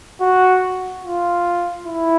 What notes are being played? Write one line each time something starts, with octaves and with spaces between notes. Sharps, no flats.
F#4
F4
E4